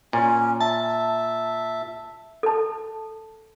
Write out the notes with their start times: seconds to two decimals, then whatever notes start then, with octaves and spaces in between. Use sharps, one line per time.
0.13 A#2 C#4
0.61 E5 A5
2.43 A4 A5